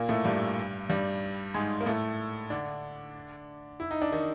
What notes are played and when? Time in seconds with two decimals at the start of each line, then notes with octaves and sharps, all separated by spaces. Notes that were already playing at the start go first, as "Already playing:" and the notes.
Already playing: A#2 A#3
0.09 A2 A3
0.24 G2 G3
0.89 G2 G3
1.54 G#2 G#3
1.81 A#3
1.86 A2 A3
2.50 D3 D4
3.80 E4
3.91 D#4
4.02 D4
4.12 D#3 D#4